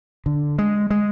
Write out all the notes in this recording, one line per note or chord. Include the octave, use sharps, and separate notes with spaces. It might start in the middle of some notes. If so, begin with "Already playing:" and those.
D3
G#3
G#3